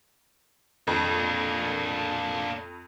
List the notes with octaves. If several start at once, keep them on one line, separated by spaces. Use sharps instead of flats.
F2 A#3 D4